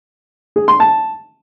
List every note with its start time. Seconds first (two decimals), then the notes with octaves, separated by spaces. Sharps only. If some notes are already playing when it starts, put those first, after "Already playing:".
0.56 G#4
0.68 C6
0.80 A5